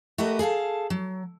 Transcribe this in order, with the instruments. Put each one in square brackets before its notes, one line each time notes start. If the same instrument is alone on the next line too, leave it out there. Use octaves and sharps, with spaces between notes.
[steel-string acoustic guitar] A3 F#4 G4 A#4 B4 D#5
G#4 A4 F5 A5
F#3